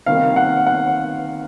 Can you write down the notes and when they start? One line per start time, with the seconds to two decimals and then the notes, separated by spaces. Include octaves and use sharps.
0.06 C3 D#3 G3 A#3 F5
0.36 F#5
0.66 F#5